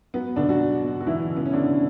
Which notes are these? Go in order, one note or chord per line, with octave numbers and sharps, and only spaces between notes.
F#3 B3
B2 D3 D4
F#3 F#4
F#3
B2
F#4
E3 F#3 E4
C#3
B3
C#4
D3 F#3 D4